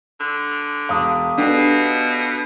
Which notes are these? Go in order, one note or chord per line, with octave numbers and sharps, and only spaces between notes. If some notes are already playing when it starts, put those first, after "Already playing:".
D3
E1 F5 D6 D#6
B2 B3 D4 G4 A4